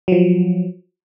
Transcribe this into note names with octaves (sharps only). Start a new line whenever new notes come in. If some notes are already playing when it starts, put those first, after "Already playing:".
F3 F#3